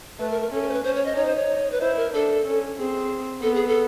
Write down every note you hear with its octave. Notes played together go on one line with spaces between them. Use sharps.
A3 B4
A#4
A#4
C#4 A4
A#4
C5
B4
C#4 C5
C#5
D#5
D#4 C#5
C5
C#5
B4
E4 C5
A#4
D4 A4
C#4
C4 G#4
B3 A4
G#4
A4